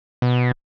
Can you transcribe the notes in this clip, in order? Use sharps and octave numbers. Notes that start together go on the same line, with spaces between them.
B2